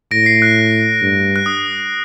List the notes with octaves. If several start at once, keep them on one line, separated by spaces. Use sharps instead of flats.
A2 A#6 D7
C7
F#6
G2
F#6
D#6